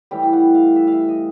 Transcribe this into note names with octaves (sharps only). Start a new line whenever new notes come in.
A2 E3 G3 G5
G5
F#5
F5
E5
F5
E5
D#5